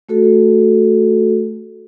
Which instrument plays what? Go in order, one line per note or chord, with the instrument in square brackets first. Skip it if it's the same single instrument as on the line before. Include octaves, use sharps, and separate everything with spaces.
[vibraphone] A3 F#4 A4